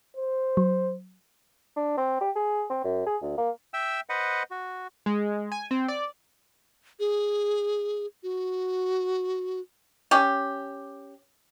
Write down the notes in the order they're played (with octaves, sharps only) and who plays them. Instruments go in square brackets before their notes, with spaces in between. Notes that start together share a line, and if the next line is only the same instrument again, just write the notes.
[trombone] C5
[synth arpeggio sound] F#3
[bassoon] D4
C4
G4
G#4
C4
F#2
G#4
D2
A#3
[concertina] E5 G5 E6
B4 C5 D#5 F#5
F#4
[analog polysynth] G#3
G#5
C4
D5
[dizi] G#4
F#4
[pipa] C#4 G4